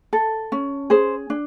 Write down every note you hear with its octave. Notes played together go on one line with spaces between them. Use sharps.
A4
C#4
G#4 C5
D4